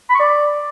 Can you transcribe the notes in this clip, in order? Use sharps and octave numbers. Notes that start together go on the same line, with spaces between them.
B5
C#6
D5